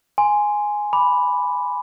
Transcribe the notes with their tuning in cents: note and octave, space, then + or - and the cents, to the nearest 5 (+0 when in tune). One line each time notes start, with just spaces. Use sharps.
G#5 +0 C6 -10
B5 +0 D6 +0